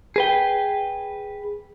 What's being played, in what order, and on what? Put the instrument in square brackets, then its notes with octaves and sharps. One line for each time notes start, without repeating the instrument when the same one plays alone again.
[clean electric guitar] G#4 B4 G5